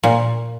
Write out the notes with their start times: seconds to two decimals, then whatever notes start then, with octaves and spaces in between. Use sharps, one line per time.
0.04 A#2